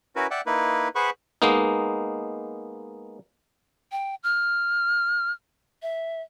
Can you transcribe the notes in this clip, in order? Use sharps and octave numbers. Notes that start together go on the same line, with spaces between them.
C#4 E4 F#4 A#4 B4
D5 E5 F#5 G5
A#3 D#4 E4 B4
G#4 B4 C5 F#5 B5 C#6
G#3 A#3 B3 D#4
G5
F6
E5